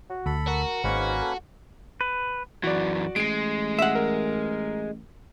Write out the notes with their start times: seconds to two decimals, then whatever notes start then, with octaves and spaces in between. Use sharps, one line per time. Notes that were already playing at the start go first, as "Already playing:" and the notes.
0.10 F#4
0.26 D2 A4 B5
0.47 F#4 A#4
0.84 G#1 G#2 A#3 C#4 B4
1.22 A4
2.01 B4
2.64 F#2 E3 F#4 D5
3.16 A1 G#3 C7 D7
3.79 E5 F#5
3.95 A#4